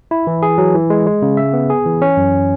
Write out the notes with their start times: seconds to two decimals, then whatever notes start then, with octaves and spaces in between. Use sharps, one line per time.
0.11 E4
0.27 E3
0.43 G#4
0.58 F#3
0.74 E3
0.90 G#3
1.07 G#3
1.22 C#3
1.37 E5
1.53 B3
1.70 G#4
1.86 E3
2.02 C#4
2.17 F#2